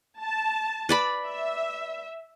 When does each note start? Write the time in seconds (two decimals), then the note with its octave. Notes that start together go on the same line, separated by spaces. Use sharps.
0.21 A5
0.89 B4 D5 B5
1.26 E5